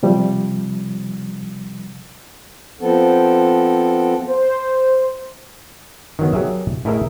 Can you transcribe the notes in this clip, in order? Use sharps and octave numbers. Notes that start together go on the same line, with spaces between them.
C3 F3 G3
F3 B3 C4 A4
C5
D#3 F#3 B3
F#3 G4 G#4 A#4 E5
A2 E4 G#4 A#4 D#5 E5